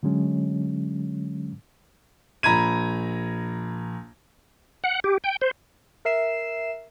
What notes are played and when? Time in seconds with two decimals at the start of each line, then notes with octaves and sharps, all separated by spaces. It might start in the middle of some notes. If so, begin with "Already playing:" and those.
0.03 D3 F#3 G#3 C#4
2.43 A#1 A#5 B5 G#6 D#7
4.84 F#5
5.04 G4
5.24 G5
5.41 C5
6.05 A#4 E5 C7 E7